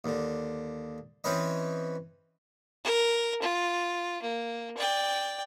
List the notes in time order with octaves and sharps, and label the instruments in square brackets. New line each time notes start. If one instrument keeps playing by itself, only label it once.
[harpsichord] D#2 D3
E3 C4 C#4 B4 D#5
[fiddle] A#4
F4
A#3
D5 G5